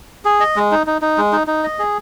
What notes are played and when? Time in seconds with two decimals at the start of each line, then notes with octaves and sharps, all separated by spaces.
0.25 G#4
0.40 D#5
0.56 G#3
0.71 D#4
0.87 D#4
1.02 D#4
1.18 G#3
1.32 D#4
1.47 D#4
1.64 D#5
1.79 G#4